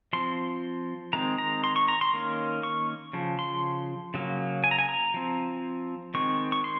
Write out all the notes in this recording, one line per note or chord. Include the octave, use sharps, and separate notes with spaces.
F3 C4 C6
D#3 G#3 C4 A#5
A#5
C6
C#6
A#5
C6
D#3 A#3 C#4
C#6
C#3 F3
C6
C#3 F#3 A#3
G#5
A#5
G#5
A#5
F3 C4
D#3 G#3 C4 C#6
C#6
C6